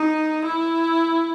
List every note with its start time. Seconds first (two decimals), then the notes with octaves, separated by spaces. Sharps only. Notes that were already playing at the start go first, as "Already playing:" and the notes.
Already playing: D#4
0.46 E4